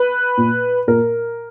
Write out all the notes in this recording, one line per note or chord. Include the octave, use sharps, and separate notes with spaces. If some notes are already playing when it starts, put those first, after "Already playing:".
Already playing: B4
A#2
A#2 A#4